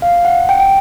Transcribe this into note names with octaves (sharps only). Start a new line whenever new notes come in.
F5
F#5
G5
G5